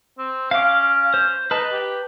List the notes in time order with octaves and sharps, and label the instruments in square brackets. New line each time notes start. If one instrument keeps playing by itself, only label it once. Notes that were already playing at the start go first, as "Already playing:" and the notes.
[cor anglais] C4
[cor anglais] C#4 [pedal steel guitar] F5 D6
[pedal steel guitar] C5
[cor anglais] D#4 [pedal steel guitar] B4 A5
[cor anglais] G4